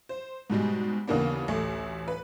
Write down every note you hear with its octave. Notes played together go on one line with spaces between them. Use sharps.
C5
G#2 B2 G3 G#3
D#2 C#3 E3 A#3 B3 D4
A1 D2 A3
B4